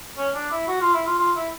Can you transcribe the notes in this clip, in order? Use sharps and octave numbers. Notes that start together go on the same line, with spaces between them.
C#4
D4
E4
F#4
F4
E4
F4
F4
E4